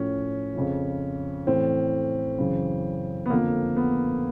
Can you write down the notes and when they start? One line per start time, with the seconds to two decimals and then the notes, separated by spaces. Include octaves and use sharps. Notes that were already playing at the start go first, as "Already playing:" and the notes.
Already playing: A2 F3 C#4
0.54 F2 C#3 F3
1.47 A2 E3 C4
2.38 F#2 C#3 E3
3.26 B3
3.30 F2 D3 F3 A#3
3.77 B3